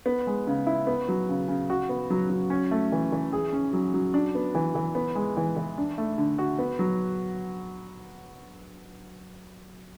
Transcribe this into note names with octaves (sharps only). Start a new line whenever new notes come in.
B3
G#3
C#3
E4
B3
F#3
C#3
C#3
F#4
B3
F#3
F#3
C#4
A3
E3
E3
G#4
C#4
F#3
F#3
D4
B3
E3
E3
B3
G#3
E3
E3
D4
A3
D3
F#4
B3
F#3